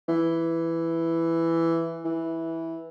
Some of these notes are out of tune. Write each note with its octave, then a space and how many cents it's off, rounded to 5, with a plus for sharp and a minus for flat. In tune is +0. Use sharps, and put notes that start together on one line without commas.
E3 +5
E3 -10